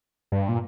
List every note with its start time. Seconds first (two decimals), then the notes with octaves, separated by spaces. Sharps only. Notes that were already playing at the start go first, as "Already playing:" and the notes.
0.32 G2
0.49 A#2